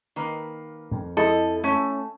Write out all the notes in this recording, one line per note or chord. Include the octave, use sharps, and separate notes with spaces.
D#3 A#3 B4
F2
F3 E4 A4 D#5
A3 C#4 A5